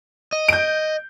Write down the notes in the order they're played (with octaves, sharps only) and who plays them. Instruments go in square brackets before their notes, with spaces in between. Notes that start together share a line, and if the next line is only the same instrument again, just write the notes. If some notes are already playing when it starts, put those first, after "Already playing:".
[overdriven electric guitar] D#5
[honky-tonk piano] G6 D7